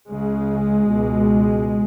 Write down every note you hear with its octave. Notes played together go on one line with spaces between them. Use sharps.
C#2 C#3 G#3
C#2 B2